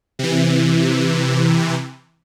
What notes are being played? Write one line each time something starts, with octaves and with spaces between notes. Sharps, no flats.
C3 E3